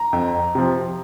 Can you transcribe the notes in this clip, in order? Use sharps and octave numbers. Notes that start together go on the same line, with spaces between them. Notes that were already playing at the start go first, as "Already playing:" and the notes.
Already playing: A#5
F2
C3 F3